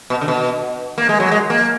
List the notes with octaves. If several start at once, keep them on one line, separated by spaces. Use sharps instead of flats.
B2
D3
B2
A#3
G#3
F#3
G#3
A#3